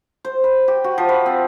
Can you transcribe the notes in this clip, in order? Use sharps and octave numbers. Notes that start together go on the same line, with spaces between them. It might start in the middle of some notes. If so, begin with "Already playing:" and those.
C5
B4
G4
F#4
F3
B4
C4